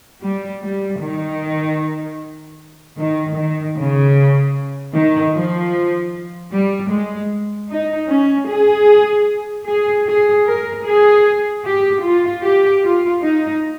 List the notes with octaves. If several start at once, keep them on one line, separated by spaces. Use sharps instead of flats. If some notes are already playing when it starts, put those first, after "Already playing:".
G3
G3
D#3
D#3
D#3
C#3
D#3
F3
G3
G#3
D#4
C#4
G#4
G#4
G#4
A#4
G#4
G4
F4
G4
F4
D#4